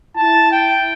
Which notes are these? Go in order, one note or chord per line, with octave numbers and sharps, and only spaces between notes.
E4 A5
G5